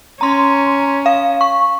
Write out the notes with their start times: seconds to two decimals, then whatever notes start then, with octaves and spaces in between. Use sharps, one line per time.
0.21 C#4 A#5 C6
1.06 F5
1.41 C#6